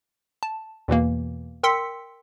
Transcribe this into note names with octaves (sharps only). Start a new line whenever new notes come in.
A5
E2 B2 E3 A#3
A#4 G5 C6 E6 B6 C#7